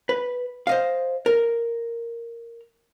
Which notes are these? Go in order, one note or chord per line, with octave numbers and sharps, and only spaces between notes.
B4
C5 D#5 F5
A#4